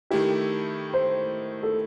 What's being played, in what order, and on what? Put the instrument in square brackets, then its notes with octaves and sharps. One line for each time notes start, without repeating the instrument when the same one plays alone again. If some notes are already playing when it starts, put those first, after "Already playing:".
[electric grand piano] D#3 A3 E4 [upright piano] G4
[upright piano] C5
A4